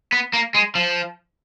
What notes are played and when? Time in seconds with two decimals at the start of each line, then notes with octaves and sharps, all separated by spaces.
0.12 B3
0.33 A#3
0.54 G#3
0.75 F3